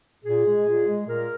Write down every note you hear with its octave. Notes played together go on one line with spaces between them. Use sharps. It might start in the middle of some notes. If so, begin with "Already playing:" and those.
A#2 G#4
G#3
A#2
G#3
A#2 A#4